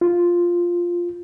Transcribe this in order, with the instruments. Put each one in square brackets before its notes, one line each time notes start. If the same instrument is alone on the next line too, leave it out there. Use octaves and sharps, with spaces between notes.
[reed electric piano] F4